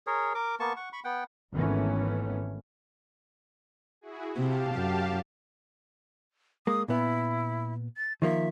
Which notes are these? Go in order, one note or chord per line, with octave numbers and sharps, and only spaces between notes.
G#4 A#4 C#5
A#4 D6
A#3 B3 A5 C#6
F#5 C#6
B5 C#6
B3 F#5 G5
G#1 D#3 E3 A3 B3 C#4
E4 F#4 G#4
C3 G4 F5 A5
F#2
G#3 A#3 D#6
A#2 B3 E4
A6
D#3 F3 A#3 E5